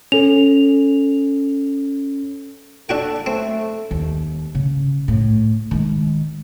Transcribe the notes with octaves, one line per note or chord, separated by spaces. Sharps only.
C#4 A4 F7
D4 F#4 A4 G5
A3 C4
D#2
C#3
A2
D#3 G#3